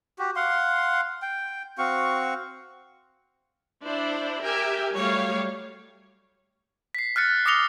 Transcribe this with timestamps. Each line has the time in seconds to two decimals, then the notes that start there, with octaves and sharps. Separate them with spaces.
0.19 F#4 G4
0.36 F5 F#5 C6
1.22 G5
1.78 C4 F#4 F5 C#6
3.84 D4 E4 C5
4.43 G4 A#4 E5 G5 G#5
4.94 F#3 G3 A3 G4 C#5 F5
6.95 B6 C7
7.16 F6 F#6 A6 C#7
7.46 D6 D#6 A#6 C#7 F7 G7